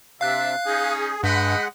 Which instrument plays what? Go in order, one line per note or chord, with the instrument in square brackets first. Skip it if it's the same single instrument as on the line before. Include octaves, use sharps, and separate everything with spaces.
[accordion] C3 [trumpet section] D4 E5 [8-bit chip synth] F5 F#6
[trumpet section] C#4 D#4 [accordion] G#4
[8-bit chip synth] G2 [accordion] G#3 F#5 [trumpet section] D#5 G5 B5